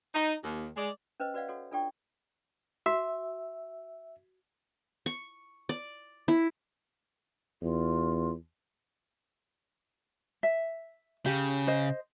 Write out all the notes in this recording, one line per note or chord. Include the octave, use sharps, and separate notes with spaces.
D#4
D#2
G#3 D5
C#4 B4 C5 D#5
F#4 B4 D5 D#5 F5 F#5
F#4 A4 C#5 F#5
D4 F4 A4 D5 G5 C#6
F#4 E5
C#6
D5
E4
E2 F4
E5
C#3 G4
C5 D#5